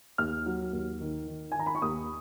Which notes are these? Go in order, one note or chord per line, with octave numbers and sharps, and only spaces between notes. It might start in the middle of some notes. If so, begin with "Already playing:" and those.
D#2 F6
F#3
D#2
D#3
D#3
G#5
D#3 A#5
B5
C#6
D#2 D#6